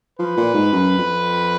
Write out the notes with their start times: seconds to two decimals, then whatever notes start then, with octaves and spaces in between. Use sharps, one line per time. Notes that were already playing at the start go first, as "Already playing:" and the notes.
0.19 F3 B4
0.37 A#2
0.54 G#2
0.72 F#2
0.98 F2